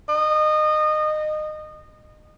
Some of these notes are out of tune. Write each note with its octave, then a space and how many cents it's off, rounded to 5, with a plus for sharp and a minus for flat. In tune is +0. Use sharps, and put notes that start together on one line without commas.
D#5 -25